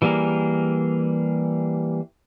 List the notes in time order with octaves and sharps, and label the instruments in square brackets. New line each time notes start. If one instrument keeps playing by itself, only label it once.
[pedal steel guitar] E3 G3 A#3 G#4 A#4